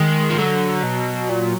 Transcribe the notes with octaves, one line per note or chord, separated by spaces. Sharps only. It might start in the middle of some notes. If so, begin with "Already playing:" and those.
Already playing: D#3 G#3
F3
D3 F#3
B2
A#2